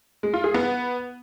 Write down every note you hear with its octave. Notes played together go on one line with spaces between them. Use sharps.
G#3
F4
G#4
B3